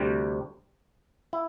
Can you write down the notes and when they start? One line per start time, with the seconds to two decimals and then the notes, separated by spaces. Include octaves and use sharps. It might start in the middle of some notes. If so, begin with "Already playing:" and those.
Already playing: D2 C3 G3
1.33 E4